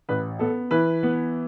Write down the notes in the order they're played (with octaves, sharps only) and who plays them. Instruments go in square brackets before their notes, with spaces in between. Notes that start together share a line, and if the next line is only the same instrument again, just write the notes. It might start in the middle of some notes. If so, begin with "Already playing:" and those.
[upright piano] A1 B4
B3 A4
E3 B4
B3